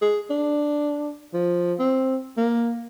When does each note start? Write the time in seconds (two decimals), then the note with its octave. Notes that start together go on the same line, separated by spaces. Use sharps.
0.02 G#4
0.30 D4
1.33 F3
1.79 C4
2.37 A#3